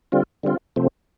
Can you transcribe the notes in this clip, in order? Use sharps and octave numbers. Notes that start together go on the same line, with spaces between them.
D3 G3 C4 F4
D3 G3 C4 F4
C3 F3 A3 C4